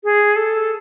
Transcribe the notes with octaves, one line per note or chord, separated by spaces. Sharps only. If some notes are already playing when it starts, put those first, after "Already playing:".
G#4
A4